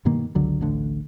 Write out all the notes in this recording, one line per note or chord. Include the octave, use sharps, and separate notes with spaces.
G2 B2 D#3 A#3
G1 C#2 D3 F#3
A1 D2 D3